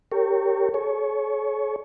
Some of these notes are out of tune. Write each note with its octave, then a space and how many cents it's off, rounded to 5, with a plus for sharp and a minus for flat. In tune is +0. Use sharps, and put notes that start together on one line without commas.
G4 -5 A#4 -35 C#5 +0
G#4 +45 C#5 +0